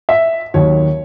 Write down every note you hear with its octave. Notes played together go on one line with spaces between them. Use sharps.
E5
D#2 D#3 F#3 C#5